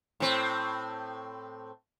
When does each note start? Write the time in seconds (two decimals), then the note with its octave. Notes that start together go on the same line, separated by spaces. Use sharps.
0.20 A2 C4